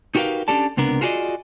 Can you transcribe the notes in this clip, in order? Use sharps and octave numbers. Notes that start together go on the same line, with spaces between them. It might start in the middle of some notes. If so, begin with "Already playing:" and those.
D#4 F#4 G4 A#4 B4 F5
C#4 D4 G4 A4 D5 A5
C#2 C3 B3 D4 A#4
F4 F#4 G#4 B4 D5 D#5